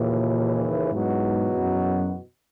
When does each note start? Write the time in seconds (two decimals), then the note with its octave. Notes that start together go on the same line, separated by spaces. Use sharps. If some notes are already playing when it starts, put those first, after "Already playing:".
Already playing: D#2 A#2 C#3 E3
0.91 E2 G#2 B2 F#3 B3 F#4
1.57 F#2